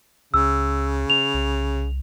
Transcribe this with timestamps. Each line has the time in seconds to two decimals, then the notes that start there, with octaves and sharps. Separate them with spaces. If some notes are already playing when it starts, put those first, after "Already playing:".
0.34 C#2 C#3 E6
1.10 F7
1.34 C2